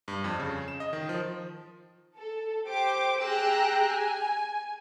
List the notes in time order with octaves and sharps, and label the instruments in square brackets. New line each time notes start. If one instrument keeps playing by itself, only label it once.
[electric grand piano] G2
F2
C#3
E7
D#5
D#3
F3
[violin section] A4
G4 C5 D6
G4 G#4 G5 A#5 E6 F#6
G#5